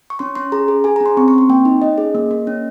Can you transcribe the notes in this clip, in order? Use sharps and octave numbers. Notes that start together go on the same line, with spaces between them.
C#6
C#4 C6
C#4 C6
G#4 A#5
G#4
G#4 G#5
C#4 A#5
C6
C4 C#6
C#6
C4 C6
A#3 G5
D#4
C#4 D#5
G#4
A#3
A#3
C#4